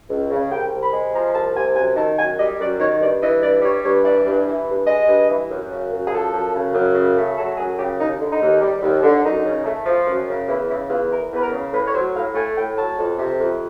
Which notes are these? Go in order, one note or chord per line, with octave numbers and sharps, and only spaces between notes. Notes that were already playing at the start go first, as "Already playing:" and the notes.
C#2
C#3
C2 G5
C3
B5
G#3
F3 A#5
C2 A5
C3 G#5
F#2 G#5
D#3 A5
F#2 G#5
G3 D#5
F#2 D5
D#3 C#5
G2 D5
E3 D#5
G2 D5
G3 C#5
G2 C#5
E3 D5
G2
E3
G2
G#3 D#5
G2
E3
F#2
C#3
F#2
G#4
F3 A4
F#2
C#3
F#2
C#3
A3
F#3 A4
F#2 G#4
C#3 G4
D#2 D#4
D3
D#4
D#2
G3
D#2
D3
F#2 D#4
C#3
A3
F3
F#2
C#3
E2 E4
C#3 E4
E2 F4
E3 A#4
E2 B4
A#4
C#3
A2 B4
C#5
F#3 C5
A2 F5
A3 G#5
A2 G5
F#3 A5
F2
C3
F2